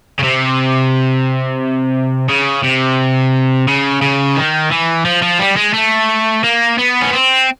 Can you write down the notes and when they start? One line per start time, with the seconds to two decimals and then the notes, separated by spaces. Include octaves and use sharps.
0.19 C#3
0.23 C3
2.29 C#3
2.64 C3
3.68 C#3
4.02 C#3
4.36 D#3
4.71 E3
5.05 F3
5.23 F3
5.40 G3
5.57 G#3
5.74 A3
6.43 A#3
6.78 B3
7.01 C#4
7.12 C4